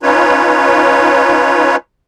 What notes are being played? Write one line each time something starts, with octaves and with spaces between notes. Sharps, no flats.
C#4 D#4 F4 B4 C#5